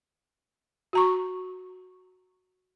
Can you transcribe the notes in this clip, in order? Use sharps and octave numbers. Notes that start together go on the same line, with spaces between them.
F#4 A#5 C#6